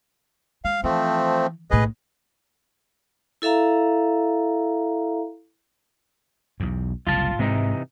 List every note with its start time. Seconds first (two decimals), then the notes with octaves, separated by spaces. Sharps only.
0.65 G#3 F5
0.84 E3 F3 A3 C4
1.71 B1 A2 G#4 B4 D#5
3.42 E4 A4 E5 F5 A#5
6.60 B1 E2
7.07 F#1 C2 F4 A5
7.39 G#2 C3 E3 G#3 C4 D#4